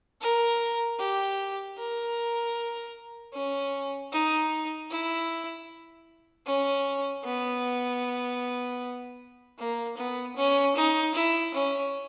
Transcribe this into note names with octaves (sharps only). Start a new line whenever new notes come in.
A#4
G4
A#4
C#4
D#4
E4
C#4
B3
A#3
B3
C#4
D#4
E4
C#4